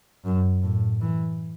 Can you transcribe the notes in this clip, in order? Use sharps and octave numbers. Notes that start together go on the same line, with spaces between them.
F#2
A2
E3